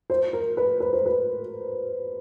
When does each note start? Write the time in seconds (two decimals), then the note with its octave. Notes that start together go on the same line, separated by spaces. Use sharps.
0.10 C5
0.33 A#4
0.57 B4
0.80 B4
0.93 C5
1.06 B4